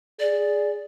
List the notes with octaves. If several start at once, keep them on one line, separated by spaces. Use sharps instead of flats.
G#4 D5